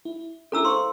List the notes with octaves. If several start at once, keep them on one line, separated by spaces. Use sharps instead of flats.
E4
C#4 D4 E4 A4 A#5 E6
C5 F5 C6 C#6